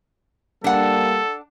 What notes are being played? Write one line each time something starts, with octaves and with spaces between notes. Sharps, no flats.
G3 A#3 D4 A4 F#5